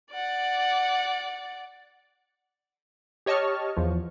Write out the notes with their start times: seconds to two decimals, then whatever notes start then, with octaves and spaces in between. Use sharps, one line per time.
0.13 D5 F#5
3.26 G4 C#5 D#5 A5 C#6 F6
3.77 E2 F3